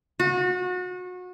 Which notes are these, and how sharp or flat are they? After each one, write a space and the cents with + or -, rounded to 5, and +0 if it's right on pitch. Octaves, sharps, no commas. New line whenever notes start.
F#4 -30